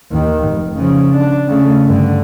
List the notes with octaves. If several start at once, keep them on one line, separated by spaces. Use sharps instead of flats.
D#2 D#3
F1
C#3 F3
D4
C#3 A3
G2 D3